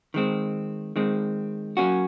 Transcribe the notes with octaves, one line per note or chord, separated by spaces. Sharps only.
D#3 G#3 C4
D#3 G#3 C4
F#3 A#3 C#4 F#4